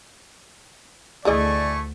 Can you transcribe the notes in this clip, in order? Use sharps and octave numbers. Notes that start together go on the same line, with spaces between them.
D2 E3 A3 G#4 D5 D#5 G#5 C#6